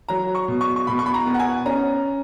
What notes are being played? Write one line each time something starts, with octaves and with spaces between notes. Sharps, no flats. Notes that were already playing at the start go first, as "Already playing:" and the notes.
F#3 A#5
C#6
B2
C#6
C#6
B2 B5
C#6
B5
A#5
B3
F#5
G#5
C#4 A#5